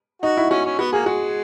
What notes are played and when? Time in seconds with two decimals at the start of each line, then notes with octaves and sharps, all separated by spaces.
0.22 D#4 F#4
0.37 E4
0.50 C#4 F#4
0.65 C#4
0.79 B3 F#4
0.92 A#3 G#4
1.06 G#3 F#4